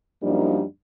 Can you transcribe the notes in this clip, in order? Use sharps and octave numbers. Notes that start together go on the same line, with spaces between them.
F#2 F3 G3 A#3 D4 D#4